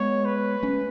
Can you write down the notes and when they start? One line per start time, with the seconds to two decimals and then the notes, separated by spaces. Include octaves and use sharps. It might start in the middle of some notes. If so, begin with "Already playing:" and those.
Already playing: G#3 B3 C#5
0.25 B4
0.63 A3 C#4